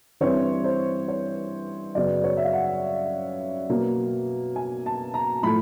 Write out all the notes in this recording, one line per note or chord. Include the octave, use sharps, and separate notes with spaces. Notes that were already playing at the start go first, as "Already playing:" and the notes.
G2 E3 G3 C4 C#5
C5
C#5
F#2 C#3 F#3 B3 D5
C#5
E5
F5
F#5
B2 F#3 A#3
G#5
A5
A#5
A2 F3 A3 B5